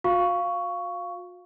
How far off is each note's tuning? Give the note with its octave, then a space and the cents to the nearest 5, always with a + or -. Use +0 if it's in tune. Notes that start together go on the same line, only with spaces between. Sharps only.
F#4 -40 F5 +0 C#6 +10